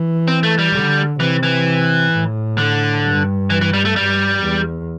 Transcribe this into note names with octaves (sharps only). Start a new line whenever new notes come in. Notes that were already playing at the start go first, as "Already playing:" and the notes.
Already playing: E3
C4
A3
G3
D3
C3 E3
E3
A2
D3
G2
E3
E3
G3
A3
G2 G3
E2